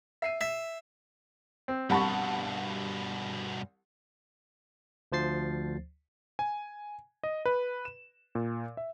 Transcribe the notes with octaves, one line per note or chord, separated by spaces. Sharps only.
E5 C7 D#7
E5 B6
C4
C2 G2 B2 G3 F#5 A5 B5 C#6
D2 F3 C5 A6 C7
G#5
D#5
B4
E7
A#2
E5